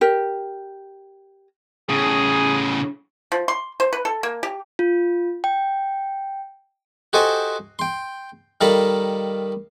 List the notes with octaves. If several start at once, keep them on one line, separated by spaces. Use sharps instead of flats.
G4 A#4
A2 C#3 G#4
F3
C6
C5
B4
A4
A#3
G4
F4
G5
F#4 G4 A4 C5 D#5 G#5
G5 C6
D#3 G3 A4 F5 A#5 B5